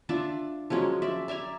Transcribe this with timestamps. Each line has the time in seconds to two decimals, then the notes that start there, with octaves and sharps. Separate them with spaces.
0.09 D4 F4 D5 E5
0.70 F3 F#3 G#3 C#4
1.02 D5 E5
1.28 D5 E5 G#5 A#5